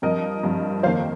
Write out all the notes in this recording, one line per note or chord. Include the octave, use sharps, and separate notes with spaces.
G2 F3 C4 A#4 D#5
G2 F3 C4
F2 D#3 A#3 C5 F5